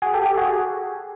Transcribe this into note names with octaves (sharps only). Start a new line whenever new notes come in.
F#4 G#4
G4 A4
G4 A4
F#4 G#4